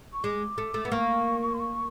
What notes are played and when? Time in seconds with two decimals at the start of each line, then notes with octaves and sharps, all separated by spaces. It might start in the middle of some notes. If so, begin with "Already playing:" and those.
0.12 C#6
0.23 G#3 D6
0.58 A3
0.74 A3
0.85 B3
0.87 D6
0.92 A#3 C#6
1.54 C6
1.59 C#6